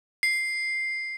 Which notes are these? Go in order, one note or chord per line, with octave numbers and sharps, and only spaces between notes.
C7